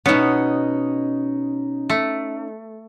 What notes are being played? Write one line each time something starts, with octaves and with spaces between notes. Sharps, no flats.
B2 B3 C#4 D#4
A3